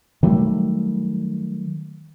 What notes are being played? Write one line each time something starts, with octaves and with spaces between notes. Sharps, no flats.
D#3 F#3 G3 A3